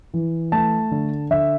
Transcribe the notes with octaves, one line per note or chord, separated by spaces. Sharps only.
E3
A3 A5
D3
D3 E5